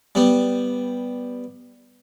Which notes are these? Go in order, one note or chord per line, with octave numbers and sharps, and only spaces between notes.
G3 B3